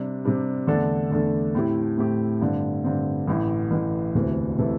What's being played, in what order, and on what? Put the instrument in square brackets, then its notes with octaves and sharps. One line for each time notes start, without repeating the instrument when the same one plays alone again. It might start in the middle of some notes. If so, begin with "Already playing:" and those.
Already playing: [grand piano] C3 G3 D4
C3 G3 D4
E2 D3 A3 D4 A4
E2 D3 A3 D4 A4
A2 A3 C4 E4 G4
A2 A3 C4 E4 G4
G2 D3 C4
G2 D3 C4
A1 A2 E3
A1 A2 E3
E1 D2 C3 E3 A3
C3 E3 A3